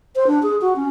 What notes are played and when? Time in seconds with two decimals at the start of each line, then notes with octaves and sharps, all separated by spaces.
0.16 C5
0.27 D4
0.43 G#4
0.61 F#4
0.76 C#4